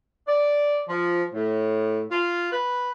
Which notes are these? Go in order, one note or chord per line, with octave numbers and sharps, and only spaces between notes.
D5
F3
A2
F4
B4